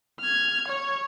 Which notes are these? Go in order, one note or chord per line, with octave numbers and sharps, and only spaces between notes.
F6 G#6
C#5